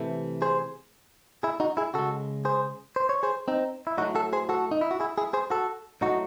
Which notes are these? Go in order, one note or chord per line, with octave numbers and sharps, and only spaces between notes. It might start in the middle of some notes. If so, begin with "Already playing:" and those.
Already playing: C3 E3 A3
G#4 C5
E4 G#4
D#4 F#4
E4 G#4
C#3 G#3 F#4 A4
G#4 C5
C5
C#5
G#4 C5
C4 D#4
E4
A2 F#3 A3 D#4 F#4
F#4 A4
G#4 C5
F#4 A4
D#4
E4
F#4
E4 G#4
E4 G#4
G#4 C5
F#4 A4
A2 F#3 A3 D#4 F#4